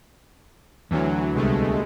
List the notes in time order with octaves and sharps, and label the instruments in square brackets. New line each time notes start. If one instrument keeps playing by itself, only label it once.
[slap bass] D2 [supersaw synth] E3 F#3
[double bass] C2 [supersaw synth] B2 G#3 A3